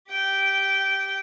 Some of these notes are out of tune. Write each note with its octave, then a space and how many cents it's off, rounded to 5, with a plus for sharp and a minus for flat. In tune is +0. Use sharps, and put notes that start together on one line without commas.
G4 +0 G5 -15